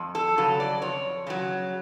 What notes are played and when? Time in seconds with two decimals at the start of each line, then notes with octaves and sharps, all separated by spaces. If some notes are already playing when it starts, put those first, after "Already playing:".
Already playing: F2
0.15 A4
0.38 C#3 F#3 A4
0.60 D5
0.82 F2 C#5
1.27 C#3 F#3